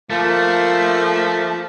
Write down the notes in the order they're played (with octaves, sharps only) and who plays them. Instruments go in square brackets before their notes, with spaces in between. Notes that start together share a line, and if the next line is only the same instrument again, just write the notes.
[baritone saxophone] F3 [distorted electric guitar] A3 [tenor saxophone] A#3